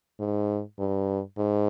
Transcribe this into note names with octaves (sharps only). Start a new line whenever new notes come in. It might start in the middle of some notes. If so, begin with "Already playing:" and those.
G#2
G2
G#2